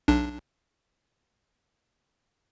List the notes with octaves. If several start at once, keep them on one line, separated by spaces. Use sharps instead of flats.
B1 D4